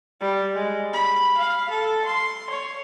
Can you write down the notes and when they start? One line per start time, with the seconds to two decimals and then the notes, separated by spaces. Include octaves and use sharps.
0.21 G3
0.54 G#3
0.93 B5
1.37 F5
1.70 A4
2.05 C6
2.50 C#5